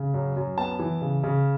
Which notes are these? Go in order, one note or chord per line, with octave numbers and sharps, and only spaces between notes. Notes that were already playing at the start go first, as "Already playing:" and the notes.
Already playing: C#3
F#2
F#2
B3 A5
E3
C#3
C#3